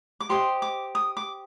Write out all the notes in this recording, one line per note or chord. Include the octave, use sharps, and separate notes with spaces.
D6
G4 C5 D#5 C6
D6
D#6
D6